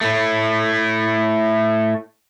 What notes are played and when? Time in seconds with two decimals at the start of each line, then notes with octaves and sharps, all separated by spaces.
0.01 A2 A3